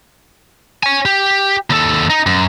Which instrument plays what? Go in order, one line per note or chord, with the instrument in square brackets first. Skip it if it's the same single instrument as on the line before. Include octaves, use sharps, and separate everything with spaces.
[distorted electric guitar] C#5 G#5
G4
D#2 A4
D#4
F#2